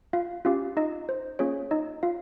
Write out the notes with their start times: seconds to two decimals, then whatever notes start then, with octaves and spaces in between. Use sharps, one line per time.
0.13 F4 F5
0.45 C#4 F4 G4 F5
0.77 D#4 D#5
1.09 C5
1.39 A#3 C#4 F4 G#4 C#5
1.71 D#4 D#5
2.03 F4 F5